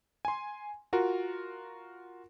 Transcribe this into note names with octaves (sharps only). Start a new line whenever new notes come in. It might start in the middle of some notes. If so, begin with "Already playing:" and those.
G#5 C6
F4 F#4 A#4